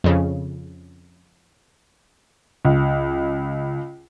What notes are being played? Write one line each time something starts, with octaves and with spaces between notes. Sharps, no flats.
F2 C#3
C#2